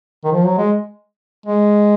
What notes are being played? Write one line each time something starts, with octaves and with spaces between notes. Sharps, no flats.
D#3
F3
F#3
G#3
G#3